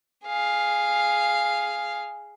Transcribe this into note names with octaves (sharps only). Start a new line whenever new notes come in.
G#4 F5